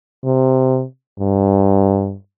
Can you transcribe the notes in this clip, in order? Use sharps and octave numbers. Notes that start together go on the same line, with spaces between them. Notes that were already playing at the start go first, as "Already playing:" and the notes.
C3
G2